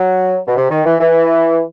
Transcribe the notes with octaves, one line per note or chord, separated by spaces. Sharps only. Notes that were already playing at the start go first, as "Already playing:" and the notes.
Already playing: F#3
B2
C3
D#3
E3
E3